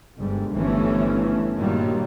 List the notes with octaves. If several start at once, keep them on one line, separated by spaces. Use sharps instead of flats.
G1 G#2 G3
G1 E3 F3 A3 C#4
G2 A#2 D#3 F#3 G3